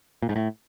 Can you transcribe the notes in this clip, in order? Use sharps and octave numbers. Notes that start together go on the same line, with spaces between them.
A#2
G#2
A2